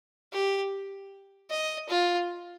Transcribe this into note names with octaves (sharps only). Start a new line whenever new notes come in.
G4
D#5
F4